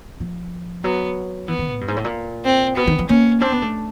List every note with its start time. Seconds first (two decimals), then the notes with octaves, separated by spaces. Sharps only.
0.20 F3
0.84 F#3 B3
1.48 E3 B3
1.59 D#3
1.70 A2
1.81 G2
1.88 G#2
1.96 A2
2.04 A#2
2.44 C4
2.76 B2 B3
2.87 D#3
2.99 F3
3.09 A#3 C#4
3.41 C4 D4
3.52 B3
3.62 A3